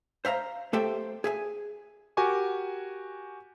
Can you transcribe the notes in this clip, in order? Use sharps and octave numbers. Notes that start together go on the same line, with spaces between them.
C5 E5 F5 A#5
A3 G4 A4 C5 E5 G5
G#4 E5 G#5
F#4 G4 A#4 G#5 C#6 D6